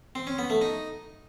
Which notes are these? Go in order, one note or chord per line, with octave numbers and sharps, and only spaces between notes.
C4
C#4
B3
A3
D#4